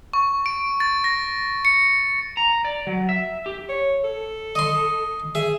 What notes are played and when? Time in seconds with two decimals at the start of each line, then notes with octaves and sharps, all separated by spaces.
0.13 C#6
0.46 D7
0.80 A6
1.04 A#6
1.65 C#7
2.37 A#5
2.65 D5
2.87 F#3
3.09 E5
3.46 G4
3.69 C#5
4.04 A4
4.55 D#5 C6
5.35 G#4 E5